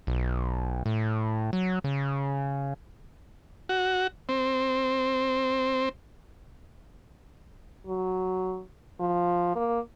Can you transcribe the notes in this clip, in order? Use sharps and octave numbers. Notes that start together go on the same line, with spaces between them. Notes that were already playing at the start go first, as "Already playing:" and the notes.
B1
A2
F#3
C#3
F#4
C4
F#3
F3
A#3